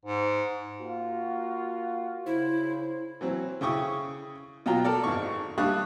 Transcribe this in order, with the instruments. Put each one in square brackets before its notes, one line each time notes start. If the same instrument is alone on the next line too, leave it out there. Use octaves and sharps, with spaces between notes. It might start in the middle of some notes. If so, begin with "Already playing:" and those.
[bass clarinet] G#2
[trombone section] A#3 F4 F#4
[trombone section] C#3 C5 [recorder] E4
[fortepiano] E3 F#3 C4
C#3 E4 G5 C#6 D#6
B2 F#3 F4 G5 A#5
A4 A#4 D5
G#1 G#2 C#6
G3 D4 F5 C#6 D#6 F#6